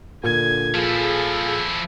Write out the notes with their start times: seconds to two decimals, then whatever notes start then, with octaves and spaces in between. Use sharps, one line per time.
0.24 A#2 D3 G#5 G#6
0.74 F3 E4 F4 G#4 A4